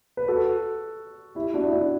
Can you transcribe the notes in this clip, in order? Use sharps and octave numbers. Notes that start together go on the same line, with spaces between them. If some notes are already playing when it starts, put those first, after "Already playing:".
B4
F#4 A4
E4 G4
D4 F#4
E4
D4 F#4